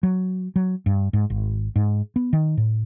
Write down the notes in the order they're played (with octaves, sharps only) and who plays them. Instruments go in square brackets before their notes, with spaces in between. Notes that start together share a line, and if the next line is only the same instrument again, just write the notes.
[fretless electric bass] F#3
F#3
G2
G#2
G#1
G#2
B3
D#3
A2